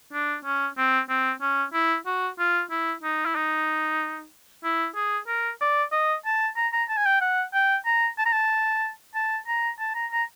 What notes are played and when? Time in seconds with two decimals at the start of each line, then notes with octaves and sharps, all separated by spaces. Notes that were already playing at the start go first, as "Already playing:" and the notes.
0.13 D4
0.45 C#4
0.77 C4
1.09 C4
1.41 C#4
1.73 E4
2.06 F#4
2.39 F4
2.71 E4
3.03 D#4
3.25 E4
3.36 D#4
4.64 E4
4.96 G#4
5.28 A#4
5.61 D5
5.92 D#5
6.25 A5
6.56 A#5
6.73 A#5
6.89 A5
6.97 G#5
7.06 G5
7.21 F#5
7.54 G5
7.86 A#5
8.18 A5
8.26 A#5
8.33 A5
9.15 A5
9.47 A#5
9.79 A5
9.95 A#5
10.12 A#5